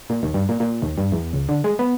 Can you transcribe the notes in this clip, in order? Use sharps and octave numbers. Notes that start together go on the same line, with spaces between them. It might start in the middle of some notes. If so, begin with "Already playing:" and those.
A#2
D#2
G2
A#2
A#2
D#2
G2
E2
C#2
D3
G#3
B3